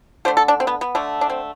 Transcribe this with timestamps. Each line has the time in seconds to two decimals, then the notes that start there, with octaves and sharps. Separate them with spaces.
0.25 D3 C5
0.28 A3
0.37 A4
0.48 D4
0.60 C4
0.67 B3
0.81 B3
0.95 D3 A3
1.21 D4
1.30 C4